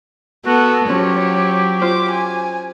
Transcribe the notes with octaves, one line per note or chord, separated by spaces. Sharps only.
B3 F#4 A4
F3 F#3 C#4 G4 C#5
F4 C5 D6
G#5